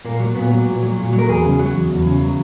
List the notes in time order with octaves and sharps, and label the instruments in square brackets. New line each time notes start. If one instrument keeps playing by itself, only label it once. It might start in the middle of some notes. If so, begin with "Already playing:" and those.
[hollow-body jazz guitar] A#2 A#3
F#3
A#2 B3
F#3
A#2
F#3
A#2
F#3
A#4
E2 G#4
C#3
F#3
E2
E2
C#3
F#3